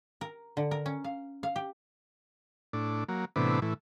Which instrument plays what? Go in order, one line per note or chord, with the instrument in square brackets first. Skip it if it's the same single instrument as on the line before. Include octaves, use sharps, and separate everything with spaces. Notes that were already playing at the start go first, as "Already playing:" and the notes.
[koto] A#4
D3
A#4
C#4
F5
F5
G4
[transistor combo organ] A2 D4
F#3 A#3
A2 C3 E3 B3 D4
A2 E3